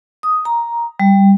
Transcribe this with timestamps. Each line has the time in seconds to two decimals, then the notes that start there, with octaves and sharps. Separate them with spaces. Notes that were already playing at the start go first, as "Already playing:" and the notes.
0.23 D#6
0.45 A#5
1.00 G3